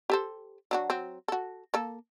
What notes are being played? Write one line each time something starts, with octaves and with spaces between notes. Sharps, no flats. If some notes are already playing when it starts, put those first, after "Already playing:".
G4 A4 C5
F#3 D4 F#4
F#3 C4
F#4 A4
A#3 A4